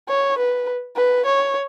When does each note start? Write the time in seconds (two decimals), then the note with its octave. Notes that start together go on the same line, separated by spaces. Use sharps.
0.08 C#5
0.38 B4
0.96 B4
1.26 C#5